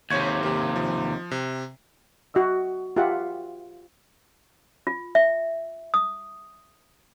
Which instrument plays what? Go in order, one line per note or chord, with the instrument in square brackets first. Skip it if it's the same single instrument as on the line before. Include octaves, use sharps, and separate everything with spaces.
[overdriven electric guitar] D#2 C3 [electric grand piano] C#5 C#6 G#6
[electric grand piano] A#3 G4
F3
C3
[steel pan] F#4 D#5 E5 E6
F4 G4 E5 F#5
[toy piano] F4
E5
D#6